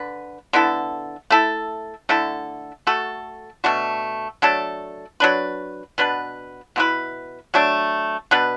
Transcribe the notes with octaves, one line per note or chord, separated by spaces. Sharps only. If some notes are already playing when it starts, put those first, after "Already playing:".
Already playing: D3 D4 B4
D3 B3 E4 A4
A3 E4 A4
D3 A3 E4 A4
A3 F#4 A4
B2 A3 D4 F#4
F#3 A3 D4 A4
F#3 D4 B4
B2 B3 D4 B4
B2 B3 E4 B4
F#3 A3 D4
B2 B3 D4 B4